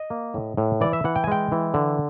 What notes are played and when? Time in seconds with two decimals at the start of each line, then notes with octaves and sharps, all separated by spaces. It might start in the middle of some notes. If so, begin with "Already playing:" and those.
Already playing: D#5
0.10 A#3
0.34 A2
0.57 A2
0.81 E3 D5
0.93 E5
1.04 E3 F#5
1.16 G5
1.24 G#5
1.27 G#3 G5
1.52 E3
1.74 D3